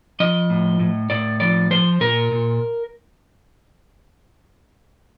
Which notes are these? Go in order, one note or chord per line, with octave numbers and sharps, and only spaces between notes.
F3 D#5
A2
A2
A2 D5
F3 D5
F3 C5
A#2 A#4
A#2